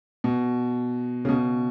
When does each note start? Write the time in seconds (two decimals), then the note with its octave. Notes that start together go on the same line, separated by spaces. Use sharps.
0.24 B2
1.25 C#3
1.29 B2